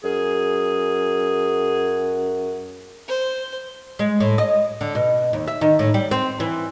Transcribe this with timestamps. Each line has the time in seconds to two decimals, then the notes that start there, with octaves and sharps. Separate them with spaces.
0.04 F#2 G#4
3.08 C5
3.99 G#3
4.20 A2
4.38 D#5
4.81 D3
4.95 B2
5.33 D#2
5.47 E5
5.61 D#3
5.79 A2
5.94 G3
6.11 C4
6.40 E3